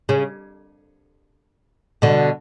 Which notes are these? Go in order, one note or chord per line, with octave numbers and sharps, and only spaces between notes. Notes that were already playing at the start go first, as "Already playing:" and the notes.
C#3
B2 D3